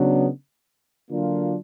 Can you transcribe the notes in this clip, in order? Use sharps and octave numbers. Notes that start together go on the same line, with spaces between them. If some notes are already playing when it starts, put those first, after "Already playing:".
Already playing: C#3 F#3 B3 D4
D3 F#3 A#3 D4 F4